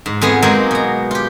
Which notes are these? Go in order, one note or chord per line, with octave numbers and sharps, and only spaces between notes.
G#2
F2 G#3 B3 G#4
F#3 G#3 A#3 C4 D#4
B2 A#5
F4 G4